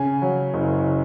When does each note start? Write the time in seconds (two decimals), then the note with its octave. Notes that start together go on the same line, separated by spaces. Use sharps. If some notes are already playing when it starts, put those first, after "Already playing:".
Already playing: C#3 G#5
0.22 F#3
0.54 F#1